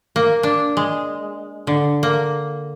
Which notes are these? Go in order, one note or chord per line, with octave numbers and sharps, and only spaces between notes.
A#3
D4
G#3
D3
A#3